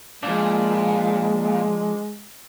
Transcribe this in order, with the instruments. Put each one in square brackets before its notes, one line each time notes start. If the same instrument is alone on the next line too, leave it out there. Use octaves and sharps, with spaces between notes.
[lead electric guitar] A#2 [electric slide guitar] F3 D4 [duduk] G#3